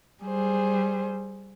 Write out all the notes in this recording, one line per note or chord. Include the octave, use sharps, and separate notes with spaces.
G3 G#4 C5